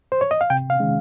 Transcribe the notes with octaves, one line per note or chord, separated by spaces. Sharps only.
C5
C#5
D#5
F5
C3 G5
F5
D#3 G#3 C#4